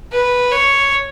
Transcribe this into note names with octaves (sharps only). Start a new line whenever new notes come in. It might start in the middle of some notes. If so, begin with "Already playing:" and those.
B4
C#5